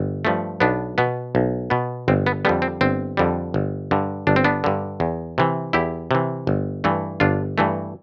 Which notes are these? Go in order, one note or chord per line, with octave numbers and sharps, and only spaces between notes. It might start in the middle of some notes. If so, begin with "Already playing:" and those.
Already playing: G1
G2 F3 A3
B1 B3 D4
B2 B3
B1
B2 B3
G1 C4
B3
F2 D3 G3 B3
C4
G1 C4
F2 D3 G3
G1
G2 D3
G1 D4
C4
B3 D4
G2 D3
E2
C3 E3
E2 E4 G4
C3 E3
G1
G2 E3 A3
G1 D4 F4
G2 E3 A3